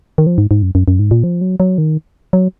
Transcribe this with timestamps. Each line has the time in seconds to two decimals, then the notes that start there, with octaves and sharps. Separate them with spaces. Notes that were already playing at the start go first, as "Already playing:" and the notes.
0.18 D#3
0.27 F3
0.38 G#2
0.51 G#2
0.62 F#2
0.75 F#2
0.88 F#2
0.99 G#2
1.11 A#2
1.24 F3
1.41 F#3
1.60 F#3
1.78 D#3
2.33 F#3